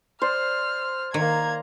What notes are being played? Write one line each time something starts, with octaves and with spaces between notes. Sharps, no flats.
C5 D5 F6
D#3 A#3 A#5 G#6